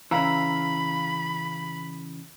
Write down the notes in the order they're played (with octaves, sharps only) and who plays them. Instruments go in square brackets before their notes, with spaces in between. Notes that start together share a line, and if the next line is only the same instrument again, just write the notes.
[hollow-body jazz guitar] C#3 E3 [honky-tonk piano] F5 A#5 E6 [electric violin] B5